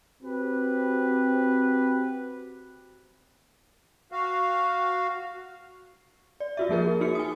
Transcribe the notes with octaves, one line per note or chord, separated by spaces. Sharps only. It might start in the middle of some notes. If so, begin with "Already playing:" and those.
C4 F#4 G4 B4
F#4 F5
D5
F4 F#4 E5
F3 A#3 G#4 A#4
D#4 F#4 C#7
G#5 D#6